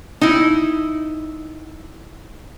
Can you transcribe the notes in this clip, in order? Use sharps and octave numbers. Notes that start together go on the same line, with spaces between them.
D#4 E4